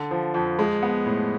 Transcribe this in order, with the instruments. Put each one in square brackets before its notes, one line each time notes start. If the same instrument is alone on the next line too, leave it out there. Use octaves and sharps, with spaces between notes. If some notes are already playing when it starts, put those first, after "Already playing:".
Already playing: [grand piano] D3
F3
F2
G#3
B3
A2